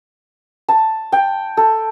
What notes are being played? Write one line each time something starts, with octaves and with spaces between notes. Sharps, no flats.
A5
G5
A4